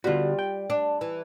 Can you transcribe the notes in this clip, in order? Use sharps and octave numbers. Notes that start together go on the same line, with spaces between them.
D3 G3 B3 F4 F#4
G5
D4
E3